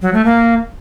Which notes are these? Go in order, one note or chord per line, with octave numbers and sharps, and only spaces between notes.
F#3
A3
A#3